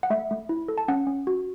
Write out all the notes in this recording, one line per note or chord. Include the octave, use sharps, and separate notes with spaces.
F#5
A3 E5
A3
E4
A4
A5
C#4 F#5
C#4
F#4